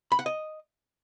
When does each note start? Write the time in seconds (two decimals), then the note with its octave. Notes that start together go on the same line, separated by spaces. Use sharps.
0.12 B5
0.19 F#5
0.26 D#5